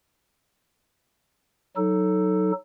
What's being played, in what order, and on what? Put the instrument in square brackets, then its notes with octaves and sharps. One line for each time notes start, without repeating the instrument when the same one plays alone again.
[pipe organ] F#3 D#4 A4